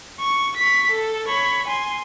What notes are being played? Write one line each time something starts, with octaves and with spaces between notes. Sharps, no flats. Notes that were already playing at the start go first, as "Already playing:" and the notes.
C#6
C#6 B6
A4
C#5 B5
G#5 C6